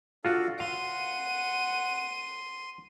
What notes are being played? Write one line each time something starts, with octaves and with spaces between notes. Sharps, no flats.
D4 F4 F#4 A4 F5
F5 F#5 C6 D#7